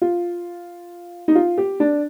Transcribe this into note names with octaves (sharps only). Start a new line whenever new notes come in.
F4
D#4
F4
G4
D4